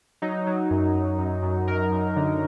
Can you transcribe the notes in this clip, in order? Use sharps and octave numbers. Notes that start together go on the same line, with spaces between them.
F#3 D#4
F#3
F#2
F#2
F#2
F#2
F#2 A#4
F#2
D3